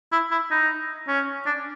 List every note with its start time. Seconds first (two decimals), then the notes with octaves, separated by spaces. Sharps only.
0.12 E4
0.31 E4
0.51 D#4
1.08 C#4
1.46 D4